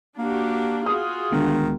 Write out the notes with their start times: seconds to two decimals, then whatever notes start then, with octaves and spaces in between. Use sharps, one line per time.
0.18 A#3 D4 F#4 G4
0.86 F4 F#4 G#4 D#6
1.32 D2 D3 D#3 G#3 B3